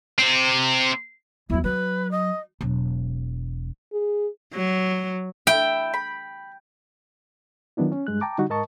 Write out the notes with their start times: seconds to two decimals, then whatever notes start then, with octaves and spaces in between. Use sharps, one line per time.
0.19 C3 C4
1.50 E2 F#3 E4
1.64 F#3 B4
2.11 D#5
2.61 E1 F#3
3.93 G#4
4.54 F#3
5.47 E4 G5
5.94 B5
7.77 D#3 F#3 B3 D4 E4
7.92 C#4
8.07 G2 G#3 F#6
8.21 G5 A5 A#5 D6
8.38 D3 G3 D#4 F#4
8.50 G#2 A#4 D#5 A5 C#6